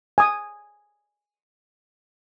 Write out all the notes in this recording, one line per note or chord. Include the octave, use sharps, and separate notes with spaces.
G#5 D#6